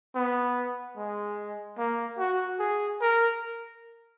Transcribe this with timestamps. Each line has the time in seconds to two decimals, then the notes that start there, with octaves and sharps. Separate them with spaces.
0.15 B3
0.97 G#3
1.78 A#3
2.19 F#4
2.59 G#4
3.01 A#4